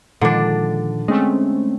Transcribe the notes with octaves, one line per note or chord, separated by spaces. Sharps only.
A#2 D3 D#3 F3 G#3 D4
G#3 A3 C4 C#4